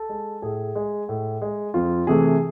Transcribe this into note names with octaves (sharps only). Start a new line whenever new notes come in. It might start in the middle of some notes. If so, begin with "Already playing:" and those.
Already playing: A4
G#3
A2 G#4
G#3
A2
G#3
F2 F4
C3 E3 A3 G#4